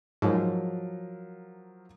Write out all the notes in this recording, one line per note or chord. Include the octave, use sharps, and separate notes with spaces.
G#2 F3 F#3 A#4